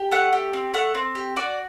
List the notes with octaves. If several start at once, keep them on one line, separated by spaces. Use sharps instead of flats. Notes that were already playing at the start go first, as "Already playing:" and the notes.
Already playing: G4
A3 F#5
G4
C4
A3 F#5
C4
G4
F#4 D5